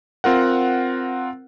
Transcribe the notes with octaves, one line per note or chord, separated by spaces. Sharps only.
C4 F4 A#4 F#5